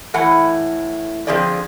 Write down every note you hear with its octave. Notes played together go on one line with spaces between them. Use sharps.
A2 E3 F#5 G#5
D3 F3 C4 G4 G#4 D5